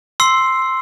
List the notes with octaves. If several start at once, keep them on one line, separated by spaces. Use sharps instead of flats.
C6 E6 C7